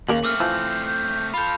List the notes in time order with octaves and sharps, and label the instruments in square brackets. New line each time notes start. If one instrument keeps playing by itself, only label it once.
[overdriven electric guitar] D#2 [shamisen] C#3 A#3 A#4 [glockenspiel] F#7
[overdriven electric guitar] A3 C4 [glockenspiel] D6 E6 F6
[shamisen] E3 F3 E4 [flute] G6
[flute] G6
[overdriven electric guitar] F4 A4 [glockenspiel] B5 G6